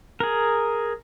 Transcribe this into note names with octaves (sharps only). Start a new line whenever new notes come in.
G#4 A#4